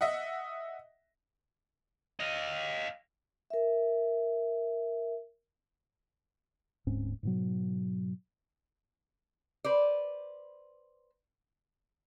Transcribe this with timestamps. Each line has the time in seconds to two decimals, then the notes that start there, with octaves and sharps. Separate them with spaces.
0.01 D#5 E5 F#5
2.20 D#5 F5
3.50 A#4 E5
6.87 D1 G#2 C4 C#4
7.23 G#2 B2 F#3
9.64 B4 C5 D5